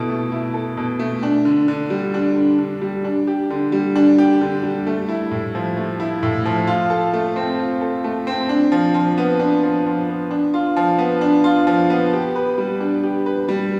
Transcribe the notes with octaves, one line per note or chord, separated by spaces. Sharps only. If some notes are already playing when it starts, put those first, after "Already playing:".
Already playing: B2 E4 A4
A3
E4
A4
B2
A3
D4
D3
D3
G3
D4
D3
D3
G3
D4
G4
D3
G3
D4
G4
D3
G3
A3
E4
A2
F3
A3
E4
A2
F3
F4
A4
A3
C4
F4
A4
A3
C4
D4
F3
F3
B3
D4
F3
F3
B3
D4
F4
F3
B3
D4
F4
F3
B3
G4
B4
G3
D4
G4
B4
G3